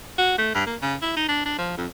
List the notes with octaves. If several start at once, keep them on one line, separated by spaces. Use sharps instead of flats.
F#4
A3
G2
A#3
C#3
E4
D#4
D4
D4
F3
F2